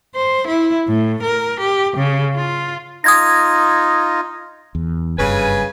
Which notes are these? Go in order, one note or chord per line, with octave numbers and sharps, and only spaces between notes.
C5
E4
A2
A#4
G4
C#3
F4
D#4 F4 D#6 G#6 A#6
E2
F#1 G2 C#3 B4 G#5